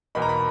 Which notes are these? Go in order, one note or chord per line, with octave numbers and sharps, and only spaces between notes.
E2 B2 A#3 D#4 B5
A#5
B5